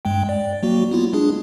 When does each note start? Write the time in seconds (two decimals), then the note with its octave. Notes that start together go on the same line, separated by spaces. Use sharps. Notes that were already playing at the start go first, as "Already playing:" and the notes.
0.05 G2 G#3 G5
0.29 D5
0.63 F#3 A#3 F#4
0.91 B3 E4 F4
1.13 G#3 D4 G#4